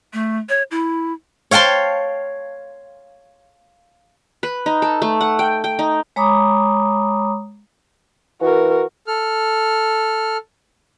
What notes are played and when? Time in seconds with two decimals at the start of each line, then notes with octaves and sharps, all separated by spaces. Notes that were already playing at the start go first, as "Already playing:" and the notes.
0.13 A3
0.49 C#5
0.71 E4
1.51 C#5 F5 G5 A5 C6
4.43 B4
4.66 D#4
4.82 A4
5.02 A3
5.21 F#5
5.39 G5
5.64 G5
5.79 D#4
6.16 G#3 C#5 A#5 B5 D6 D#6
8.41 E3 F#4 A#4
9.07 A4 F6